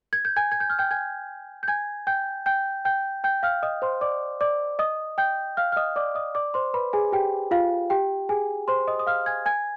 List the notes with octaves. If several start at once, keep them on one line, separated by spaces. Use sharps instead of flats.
G#6
G6
G#5 G#6
G#6
G6
F6
G5 G6
G#5 G#6
G6
G#5 G#6
G5 G6
G5 G6
G5 G6
G5 G6
F5 F6
D#5 D#6
C5 C6
D5 D6
D5 D6
D#5 D#6
G5 G6
F5 F6
F6
D#5 D#6
D5 D6
D#5 D#6
D5 D6
C5 C6
B4 B5
G#4 G#5
G4 G5
F4 F5
G4 G5
G#4 G#5
C5 C6
D#5 D#6
D#6
F5 F6
G#5 G#6
G#5 G#6